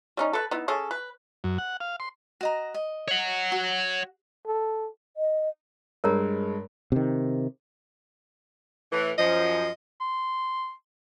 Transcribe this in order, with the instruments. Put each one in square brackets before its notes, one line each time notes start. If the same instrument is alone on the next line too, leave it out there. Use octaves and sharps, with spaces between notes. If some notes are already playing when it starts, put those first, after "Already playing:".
[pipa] G3 C#4 D#4
A4 B4
B3 D#4 E4
C#4 G#4 A4
B4
[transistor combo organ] F#2
F#5
F5
C6
[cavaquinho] F#4 D#5 A#5
D#5
[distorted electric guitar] C#5 F#5
[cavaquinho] F#4
[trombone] A4
[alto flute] D#5
[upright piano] G2 G#3 [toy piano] A#4 C#5 A#5
[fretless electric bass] C3 D#3
[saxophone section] A2 E3
[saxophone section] F#2 F3 [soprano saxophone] D#5
[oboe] C6